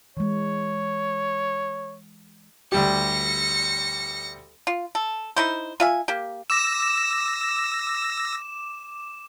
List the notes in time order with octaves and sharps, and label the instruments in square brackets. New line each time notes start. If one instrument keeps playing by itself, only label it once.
[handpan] E3 G#3 [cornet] C#5
[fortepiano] D2 G3 G4 [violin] A#6 C#7
[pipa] F4
A4
D#4 E4 C5
F4 E5 G#5
A#3 G4
[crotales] D6 E7 [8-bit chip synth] E6 A#6